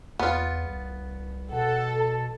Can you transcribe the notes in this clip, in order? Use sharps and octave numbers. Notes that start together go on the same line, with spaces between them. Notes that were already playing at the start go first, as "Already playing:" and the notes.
E2 B3 F4
C2
B2 A4 F#5
A5